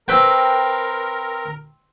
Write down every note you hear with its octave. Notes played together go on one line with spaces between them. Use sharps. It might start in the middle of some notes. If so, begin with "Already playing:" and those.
C4 A#4 B4 G5